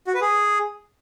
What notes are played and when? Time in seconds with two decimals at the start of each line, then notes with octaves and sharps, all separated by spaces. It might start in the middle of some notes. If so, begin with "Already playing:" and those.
0.07 F#4
0.14 B4
0.21 G#4